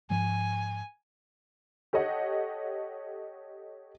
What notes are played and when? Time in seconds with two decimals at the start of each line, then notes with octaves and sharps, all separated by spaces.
0.10 G#2 F3 G#3 G#5
1.93 G4 A4 C#5 D#5 F#5